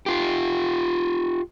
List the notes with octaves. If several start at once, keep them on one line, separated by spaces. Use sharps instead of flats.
F4 G4